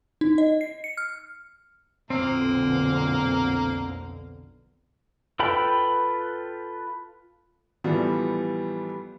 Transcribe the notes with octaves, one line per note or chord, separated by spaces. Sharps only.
D#4
D#5
C7
C#7
F6
B1 F2 A#2 D3 A#3 C4
F4 A4 B4 G5 B5
A2 E3 F3 G3 B3 F4